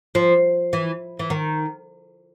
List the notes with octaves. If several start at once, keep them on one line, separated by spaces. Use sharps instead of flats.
F3
E3
E3
D#3